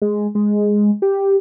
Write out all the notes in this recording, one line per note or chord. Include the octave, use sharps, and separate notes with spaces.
G#3
G#3
G4